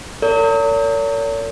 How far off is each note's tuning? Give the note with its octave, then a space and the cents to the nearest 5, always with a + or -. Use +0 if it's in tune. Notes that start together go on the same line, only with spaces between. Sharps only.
A#4 -40 C#5 +45